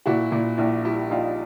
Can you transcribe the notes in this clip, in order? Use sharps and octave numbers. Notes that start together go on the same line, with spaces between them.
A#2 E4 F#4
A#2 E4
A#1 E4
G3 E4
A#1 D#4 F4